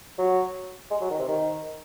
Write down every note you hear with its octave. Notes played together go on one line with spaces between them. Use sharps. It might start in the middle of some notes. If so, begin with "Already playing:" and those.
F#3
G#3
F#3
D#3
C3
D#3